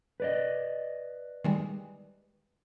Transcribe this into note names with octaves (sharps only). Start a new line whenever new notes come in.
B4 D5 D#5
D#3 G3 G#3